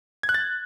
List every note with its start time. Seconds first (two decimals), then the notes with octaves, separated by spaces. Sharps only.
0.23 G#6
0.29 F#6
0.34 A6